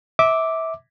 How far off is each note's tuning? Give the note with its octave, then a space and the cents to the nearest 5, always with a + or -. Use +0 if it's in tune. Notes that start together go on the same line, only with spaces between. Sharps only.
E5 -25 D6 +0